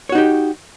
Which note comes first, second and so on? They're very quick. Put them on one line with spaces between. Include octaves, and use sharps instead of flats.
C#5 F#4 D#4 G4